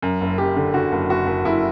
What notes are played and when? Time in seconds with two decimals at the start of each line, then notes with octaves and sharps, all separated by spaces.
0.02 F#2
0.21 F#1
0.38 F#2 G4
0.57 D3
0.74 D3 F#4
0.92 F#1
1.09 F#1 F#4
1.27 F#1
1.45 F#1 E4